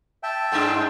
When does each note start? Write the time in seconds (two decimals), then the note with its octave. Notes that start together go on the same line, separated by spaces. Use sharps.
0.23 E5 G5 A5
0.52 G2 G#3 D4